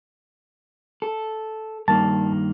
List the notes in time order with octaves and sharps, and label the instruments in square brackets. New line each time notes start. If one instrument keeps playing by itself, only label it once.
[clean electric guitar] A4
[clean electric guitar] G2 D#3 A#3 [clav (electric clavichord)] A5